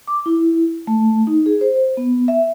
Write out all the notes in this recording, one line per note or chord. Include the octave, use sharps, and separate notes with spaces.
D6
E4
A3
D#4
G#4
C5
B3
E5